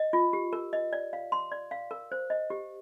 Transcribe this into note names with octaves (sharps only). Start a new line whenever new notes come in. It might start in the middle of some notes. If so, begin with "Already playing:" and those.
Already playing: D#5
F4
G4
A#4
D#5
D5
F5
C6
D5
F5
A#4
C5
D#5
G4